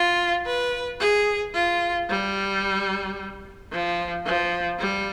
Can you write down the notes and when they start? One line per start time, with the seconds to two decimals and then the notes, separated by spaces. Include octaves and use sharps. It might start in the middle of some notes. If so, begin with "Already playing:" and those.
Already playing: F4
0.46 B4
1.00 G#4
1.54 F4
2.09 G3
3.72 F3
4.26 F3
4.79 G3